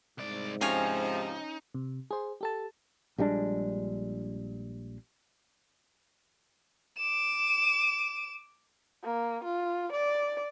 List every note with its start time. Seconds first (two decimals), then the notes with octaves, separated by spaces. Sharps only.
0.18 C2 G#2 D5
0.61 C3 F3 C#4 D#4 F5 G#5
1.75 C3
2.11 G#4 C5
2.41 G4 A4 A5
3.18 A#1 G3 G#3 D4
6.98 D6 E7
9.04 A#3
9.44 F4
9.92 D5